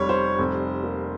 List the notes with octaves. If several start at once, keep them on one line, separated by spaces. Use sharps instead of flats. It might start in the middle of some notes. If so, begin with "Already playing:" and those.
Already playing: F1 G3 C#5
C5
F1
A#3